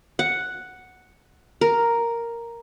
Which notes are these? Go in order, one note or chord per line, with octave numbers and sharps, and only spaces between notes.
F#5
A#4